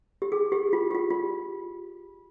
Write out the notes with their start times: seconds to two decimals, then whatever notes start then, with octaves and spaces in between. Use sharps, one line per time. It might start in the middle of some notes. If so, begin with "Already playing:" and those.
0.22 G4
0.32 G#4
0.52 G4
0.73 F4
0.91 G4
0.95 F4
1.10 F4